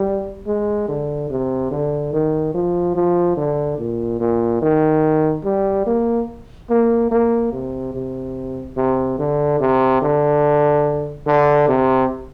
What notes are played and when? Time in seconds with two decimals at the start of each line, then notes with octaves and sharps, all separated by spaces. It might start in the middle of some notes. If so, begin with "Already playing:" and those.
Already playing: G3
0.47 G#3
0.88 D3
1.30 C3
1.71 D3
2.13 D#3
2.54 F3
2.95 F3
3.37 D3
3.78 A#2
4.20 A#2
4.62 D#3
5.44 G3
5.87 A#3
6.70 A#3
7.11 A#3
7.52 C3
7.94 C3
8.77 C3
9.19 D3
9.60 C3
10.02 D3
11.27 D3
11.68 C3